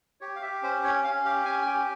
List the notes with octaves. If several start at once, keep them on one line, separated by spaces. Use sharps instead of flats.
G4 C#5
F5
G4 E5
C#4 C5
C#4 C#5
C#4 F5
G4 F5
C#4 G#5
G#5
G4 G5